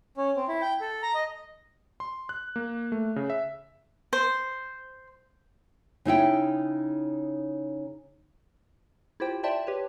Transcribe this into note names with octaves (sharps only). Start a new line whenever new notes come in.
C#4
C4
E4
G5
A4
A#5
D#5
C6
F#6
A#3
A3
C#3
E5
C5
C#3 D#4 E4 G5
E4 F4 G4 C5 G5
C5 D5 E5 G5 A5 C6
G4 B4 C#5